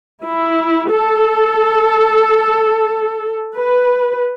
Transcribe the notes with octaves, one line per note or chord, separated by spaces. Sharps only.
E4
A4
B4